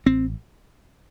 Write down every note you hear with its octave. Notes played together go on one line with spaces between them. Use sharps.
A1 C4